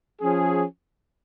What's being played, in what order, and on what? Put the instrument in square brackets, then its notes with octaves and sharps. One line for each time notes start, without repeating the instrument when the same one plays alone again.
[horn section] F3 C#4 G#4